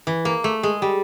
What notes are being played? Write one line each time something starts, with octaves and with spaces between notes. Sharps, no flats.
E3
A#3
A3
G#3
G3